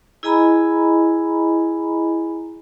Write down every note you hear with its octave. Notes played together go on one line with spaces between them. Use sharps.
E4 G#4 D#5 G#5 A#5 B5